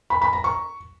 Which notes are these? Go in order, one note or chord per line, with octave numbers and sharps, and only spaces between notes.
B5
B5
A#5
C#6